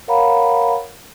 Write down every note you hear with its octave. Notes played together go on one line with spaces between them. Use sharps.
A#4 C#5 F5 F#5 A#5 B5